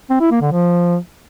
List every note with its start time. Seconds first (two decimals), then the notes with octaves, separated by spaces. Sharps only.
0.10 C4
0.20 E4
0.31 A#3
0.41 D3
0.52 F3